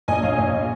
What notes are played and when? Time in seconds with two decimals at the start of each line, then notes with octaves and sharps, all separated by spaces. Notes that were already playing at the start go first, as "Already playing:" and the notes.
0.08 A#1 D#5 G#5
0.23 A#1 C#5 F5
0.38 A#1 D#5
0.48 C#5